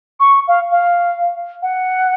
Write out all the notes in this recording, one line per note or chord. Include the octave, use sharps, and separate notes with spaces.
C#6
F5
F5
F#5